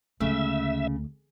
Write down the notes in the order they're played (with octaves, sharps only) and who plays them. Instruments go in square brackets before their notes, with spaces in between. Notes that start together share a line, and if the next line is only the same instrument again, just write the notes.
[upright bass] D2 G#3 [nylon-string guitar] C#3 [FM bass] A3 [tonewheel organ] E5